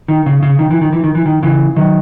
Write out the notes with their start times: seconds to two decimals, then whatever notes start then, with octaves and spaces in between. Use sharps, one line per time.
0.08 D#3
0.26 C#3
0.43 C#3
0.59 D#3
0.71 E3
0.81 D#3
0.93 E3
1.04 D#3
1.15 E3
1.26 D#3
1.43 C#3 E3
1.76 D#3 F#3